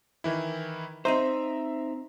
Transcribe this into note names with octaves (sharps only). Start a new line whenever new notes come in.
D#3 E3 E4
C4 D#4 C5 E5 A#5